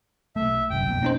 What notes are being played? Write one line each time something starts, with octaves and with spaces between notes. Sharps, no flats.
B1 A3 E5
G1 C2 F#2 G5
F2 B2 A#3
C#4 D#4 C5